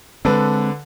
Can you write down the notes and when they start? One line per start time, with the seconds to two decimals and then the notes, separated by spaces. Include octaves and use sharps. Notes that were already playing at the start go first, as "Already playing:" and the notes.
0.25 D3 G#3 C4 A4 B4